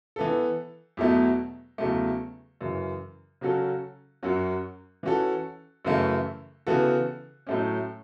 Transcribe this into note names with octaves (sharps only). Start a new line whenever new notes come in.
E3 B3 A4
E2 B2 F#3 A3
E2 C#3 F#3 A3
F#2 C#3 E3
C#3 F#3 C#4 F#4 A4
F#2 F#3 C#4 F#4
E3 C#4 F#4 A4
F#2 C#3 E3 A3 E4
C#3 E3 B3 F#4 A4
A2 F#3 A3 C#4